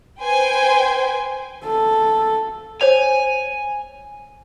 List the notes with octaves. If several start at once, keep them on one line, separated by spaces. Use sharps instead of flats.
B4 C5 G5 G#5
A4
C5 C#5 G#5 F7